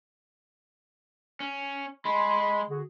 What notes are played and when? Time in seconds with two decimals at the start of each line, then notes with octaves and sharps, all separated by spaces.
1.40 C#4
2.05 G#3 B5 C6
2.69 D3 F#4 G#4